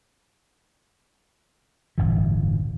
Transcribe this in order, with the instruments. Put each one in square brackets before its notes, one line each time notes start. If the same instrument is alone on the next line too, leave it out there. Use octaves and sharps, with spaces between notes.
[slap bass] D1 G1 E3